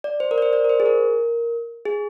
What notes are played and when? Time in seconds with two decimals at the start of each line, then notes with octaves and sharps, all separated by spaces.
0.04 D5
0.20 C5
0.31 A#4
0.38 D5
0.42 C5
0.53 D5
0.64 A#4
0.69 C5
0.80 G#4
0.86 A#4
1.85 G#4